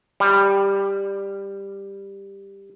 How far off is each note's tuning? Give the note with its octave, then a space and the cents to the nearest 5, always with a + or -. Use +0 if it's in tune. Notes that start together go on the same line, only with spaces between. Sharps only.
G3 +10